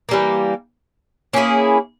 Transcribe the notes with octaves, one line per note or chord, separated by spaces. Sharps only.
E3 G3 A#3
A#3 C#4 E4 G#4